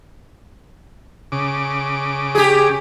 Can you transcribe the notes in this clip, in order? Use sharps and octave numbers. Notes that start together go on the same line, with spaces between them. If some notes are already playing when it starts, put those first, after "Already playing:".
C#3 D6
G4 G#4